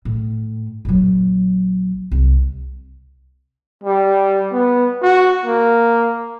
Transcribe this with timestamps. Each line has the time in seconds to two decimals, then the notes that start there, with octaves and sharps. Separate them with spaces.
0.05 A2
0.85 A#1 F#3
2.12 C2
3.84 G3
4.52 B3
5.02 F#4
5.46 A#3